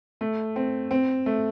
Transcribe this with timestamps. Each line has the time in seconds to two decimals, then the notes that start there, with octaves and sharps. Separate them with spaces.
0.21 A3
0.56 C4
0.91 C4
1.26 A3